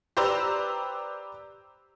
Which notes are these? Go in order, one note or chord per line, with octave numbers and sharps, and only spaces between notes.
G4 B4 C5 D5 A#5 E6